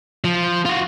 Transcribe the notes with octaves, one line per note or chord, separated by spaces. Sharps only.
F3
F4 F#4